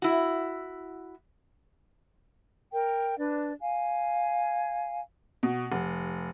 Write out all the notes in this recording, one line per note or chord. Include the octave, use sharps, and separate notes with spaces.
E4 F#4
A#4 G5
D4 B4 D5
F5 G#5
B2
F1